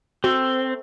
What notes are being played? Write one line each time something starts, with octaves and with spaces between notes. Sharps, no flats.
A3 C4 F#4 E6